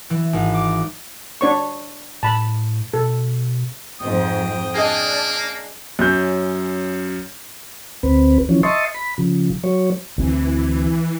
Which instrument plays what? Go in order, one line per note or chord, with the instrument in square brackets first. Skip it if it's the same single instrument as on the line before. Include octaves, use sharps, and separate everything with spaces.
[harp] E3
G#1
D6
[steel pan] D4 C#5 C#6
[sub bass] A2 [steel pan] A5 B5
[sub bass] B2 [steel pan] A4
[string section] F2 G#2 [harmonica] G5 D#6
[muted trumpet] A#3 [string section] D4 [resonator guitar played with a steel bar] G#4 D#5
[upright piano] F#2 C#4 G6
[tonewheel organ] D2 C4 B4
E3 F3 C#4
D#5 E5 A5 C6 C#6 D#6
B5
C#3 F3
F#3 C#5
[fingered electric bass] D2 C4 [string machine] E3